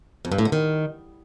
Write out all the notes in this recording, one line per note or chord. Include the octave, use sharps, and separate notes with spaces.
F2
G2
A2
D3
D#3